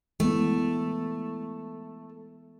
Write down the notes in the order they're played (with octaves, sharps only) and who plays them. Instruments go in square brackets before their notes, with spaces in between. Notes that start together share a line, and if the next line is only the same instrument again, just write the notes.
[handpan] E3 G#3 B3 [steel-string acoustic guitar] A3